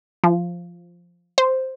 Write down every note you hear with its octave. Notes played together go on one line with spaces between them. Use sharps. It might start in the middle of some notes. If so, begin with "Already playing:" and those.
F3
C5